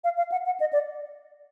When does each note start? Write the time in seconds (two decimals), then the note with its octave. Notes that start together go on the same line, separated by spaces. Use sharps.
0.04 F5
0.18 F5
0.32 F#5
0.46 F#5
0.60 D#5
0.73 D5